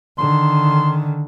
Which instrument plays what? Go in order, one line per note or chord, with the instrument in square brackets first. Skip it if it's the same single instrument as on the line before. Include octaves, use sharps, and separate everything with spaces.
[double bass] D3 D#3 [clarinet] C6